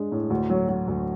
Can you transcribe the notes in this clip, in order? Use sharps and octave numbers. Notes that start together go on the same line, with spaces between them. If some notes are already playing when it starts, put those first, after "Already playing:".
Already playing: G#3 D4
A2
D2
F#3
F#3
D2